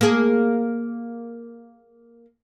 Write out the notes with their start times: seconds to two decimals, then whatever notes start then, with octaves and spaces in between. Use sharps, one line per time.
0.01 A#3 G#4